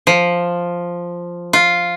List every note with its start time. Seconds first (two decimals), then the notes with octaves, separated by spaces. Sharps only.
0.07 F3
1.53 F4